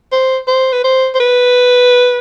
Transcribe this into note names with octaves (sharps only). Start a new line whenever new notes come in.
C5
C5
B4
C5
C5
B4